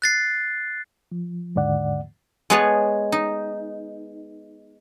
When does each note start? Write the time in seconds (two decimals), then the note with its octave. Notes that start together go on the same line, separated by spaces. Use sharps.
0.02 F#6 A6 C7
1.12 F3
1.55 D#2 G#2 D3 D5 F#5
2.50 G#3 B3 G#4 B4 C#5 A5
3.12 D#4